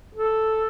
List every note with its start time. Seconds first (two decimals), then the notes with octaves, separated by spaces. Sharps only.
0.15 A4